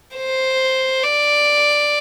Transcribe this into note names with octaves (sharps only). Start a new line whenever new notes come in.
C5
D5